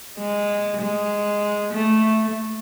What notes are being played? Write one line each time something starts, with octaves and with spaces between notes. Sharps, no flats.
G#3
G#3
A3